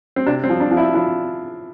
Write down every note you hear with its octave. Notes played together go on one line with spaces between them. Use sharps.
C4
C3 D4
C4
F3
D4
F3
E4
F3 E4